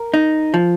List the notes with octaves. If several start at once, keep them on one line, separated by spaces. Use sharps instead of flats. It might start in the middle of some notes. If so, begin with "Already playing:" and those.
Already playing: A#4
D#4
F3